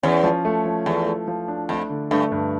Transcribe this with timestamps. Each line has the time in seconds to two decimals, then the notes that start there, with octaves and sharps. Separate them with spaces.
0.03 E2 C#4
0.23 F3
0.45 A3
0.65 F3
0.86 E2 A3
1.07 A3
1.28 F3
1.48 D4
1.69 F2 A3
1.90 D3
2.11 G2 A3
2.32 G2